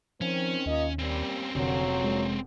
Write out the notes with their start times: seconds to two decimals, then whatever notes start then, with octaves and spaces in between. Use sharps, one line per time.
0.21 D#3 F3 C4 C#4
0.66 D#2 A#3 F4 D#5
0.99 G3 A#3 C4 C#4
1.55 F1 A#2 D3 F#3
2.04 G#3